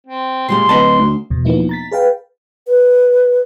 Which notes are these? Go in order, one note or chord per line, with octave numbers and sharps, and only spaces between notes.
C4
A#2 G3 G#3 C6
D1 B4 D#5 A5
D2
E2 B2
F3 A#3 B3 D#4 E4
A#5 A6 B6
G#4 B4 F5 G5
B4